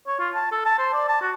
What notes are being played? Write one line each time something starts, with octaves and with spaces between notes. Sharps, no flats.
C#5
F4
A5
A4
A5
C5
D5
A5
F#4